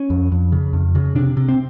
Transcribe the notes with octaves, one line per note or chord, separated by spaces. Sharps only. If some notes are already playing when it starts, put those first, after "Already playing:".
Already playing: C#4
F2
F2
C#3
F2
C#3
C3 D4
C3
C4